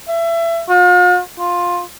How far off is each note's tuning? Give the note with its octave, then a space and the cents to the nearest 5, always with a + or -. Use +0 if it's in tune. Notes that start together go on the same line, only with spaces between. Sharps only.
E5 +25
F4 +45
F4 +10